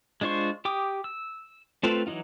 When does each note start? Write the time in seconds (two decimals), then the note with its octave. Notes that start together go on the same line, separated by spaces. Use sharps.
0.21 G#3 D4 F4 C5 C#6
0.65 G4 G5 D6 D#6
1.04 E6
1.83 A3 C4 F4 A4 B4
2.07 E3 F#3 D#4 F4